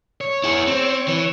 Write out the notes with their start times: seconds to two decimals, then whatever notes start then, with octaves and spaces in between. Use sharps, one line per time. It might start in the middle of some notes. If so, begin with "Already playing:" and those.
0.21 C#5
0.44 E4 G#4
0.67 C4
1.08 E3